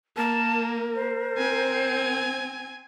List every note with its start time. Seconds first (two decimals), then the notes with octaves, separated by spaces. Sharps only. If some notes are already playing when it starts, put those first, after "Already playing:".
0.17 A#3 A#4 A5
0.95 C5
1.37 C4 G#5